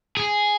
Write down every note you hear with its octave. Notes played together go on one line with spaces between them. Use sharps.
G#4